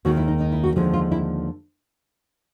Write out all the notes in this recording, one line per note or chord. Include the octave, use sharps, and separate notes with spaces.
D#2 D#3 G#3 F#4
E4
D#4
D#4
E4
F#4
D#2 D3 F3 G#3 F4
F4
E4